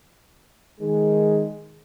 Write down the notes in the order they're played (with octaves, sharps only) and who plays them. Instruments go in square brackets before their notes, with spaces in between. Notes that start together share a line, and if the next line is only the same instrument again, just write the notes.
[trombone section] D#3 G#3